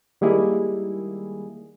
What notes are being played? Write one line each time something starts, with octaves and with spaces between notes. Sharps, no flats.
D#3 G3 G#3 A#3 E4 G#4